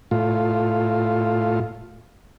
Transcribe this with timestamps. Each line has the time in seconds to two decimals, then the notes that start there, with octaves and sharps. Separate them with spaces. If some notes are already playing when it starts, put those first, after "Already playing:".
0.11 A2 F4